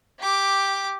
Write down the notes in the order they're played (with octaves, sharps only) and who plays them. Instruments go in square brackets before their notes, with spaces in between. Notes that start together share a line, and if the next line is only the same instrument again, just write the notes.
[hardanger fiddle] G4 D6